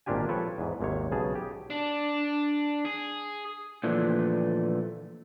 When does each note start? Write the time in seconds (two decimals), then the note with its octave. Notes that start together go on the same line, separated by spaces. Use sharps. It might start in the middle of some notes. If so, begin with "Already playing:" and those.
0.06 G#1 A#2 D4 F4 G4 G#5
0.28 F3 A4 B4 C#5 G5
0.58 E2 G#2
0.81 G#1 D#2 C3 C#5
1.12 B1 C#3 G#4 A5
1.35 G4
1.70 D4
2.85 G#4
3.84 A#2 D3 E3 F3 A3